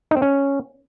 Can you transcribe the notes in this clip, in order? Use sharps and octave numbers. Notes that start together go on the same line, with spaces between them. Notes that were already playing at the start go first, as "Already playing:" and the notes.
D#4
C4
C#4